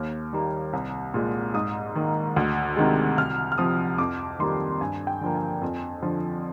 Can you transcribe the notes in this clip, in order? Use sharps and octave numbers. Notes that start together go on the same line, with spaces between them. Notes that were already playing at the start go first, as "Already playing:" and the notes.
Already playing: D#2 F6
D#3 G3 A#3
C2
A#2 G#3
G#2 D#6
D#3 A#3
D2
C3 D#3 G#3
C2 F6
F6
C3 F3 D#6
F2 D6
D#3 G3 A#3 C6
G2 G#5
G5
D3 F3 A#3
G#5
F2
D3 F3